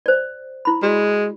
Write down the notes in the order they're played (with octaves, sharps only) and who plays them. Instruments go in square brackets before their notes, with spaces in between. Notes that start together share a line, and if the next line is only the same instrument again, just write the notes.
[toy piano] C5 D5
E4 B5
[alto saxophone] G#3 [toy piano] F#4 D5